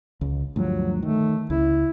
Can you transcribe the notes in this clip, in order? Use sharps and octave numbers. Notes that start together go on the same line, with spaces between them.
C#2
D2 G2 F3 F#3
D#3 A3
C#2 E4